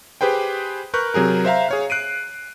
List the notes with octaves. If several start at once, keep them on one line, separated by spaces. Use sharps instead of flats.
G4 G#4 B4 C5 G5
A#4 B4 C#6 F#6 G6
C3 F#3 G#4 A#4
C5 E5 F5 A#5
G#4 C#5 F5
F#6 C7 D7 D#7